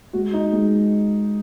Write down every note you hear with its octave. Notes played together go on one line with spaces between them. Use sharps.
G#3 F#4
D#4
G#3